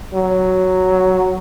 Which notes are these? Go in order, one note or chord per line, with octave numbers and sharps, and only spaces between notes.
F#3